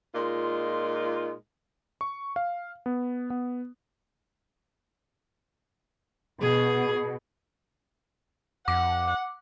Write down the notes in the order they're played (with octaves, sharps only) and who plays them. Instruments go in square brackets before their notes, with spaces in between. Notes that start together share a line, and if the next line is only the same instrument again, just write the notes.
[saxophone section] A#2 G#3 D#4 F4
[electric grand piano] C#6
F5
B3
B3
[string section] B2 [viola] G#4
[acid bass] F2 [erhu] F#5 [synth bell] D6